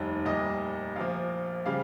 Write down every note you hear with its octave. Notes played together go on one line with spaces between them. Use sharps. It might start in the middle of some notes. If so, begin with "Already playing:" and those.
Already playing: F1 D#2 D#3 G3 D#5
C2 A#2 G3 D#5
A#1 A#2 F3 F5
C#3 G3 F5